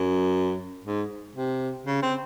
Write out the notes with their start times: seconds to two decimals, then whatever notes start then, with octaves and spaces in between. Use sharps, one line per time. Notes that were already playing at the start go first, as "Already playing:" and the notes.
Already playing: F#2
0.85 G#2
1.36 C3
1.87 C#3
2.03 C4